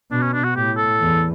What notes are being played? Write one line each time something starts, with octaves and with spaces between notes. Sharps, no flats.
B2 D4
C#4
D4
F#4
A2 G4
A4
E2